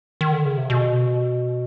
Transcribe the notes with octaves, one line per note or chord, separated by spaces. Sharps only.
D#3
D3
C#3
C3
B2